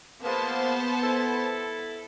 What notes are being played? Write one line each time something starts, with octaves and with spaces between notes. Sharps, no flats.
F3 G#3 A#3 B3 C5 A5
E4 A4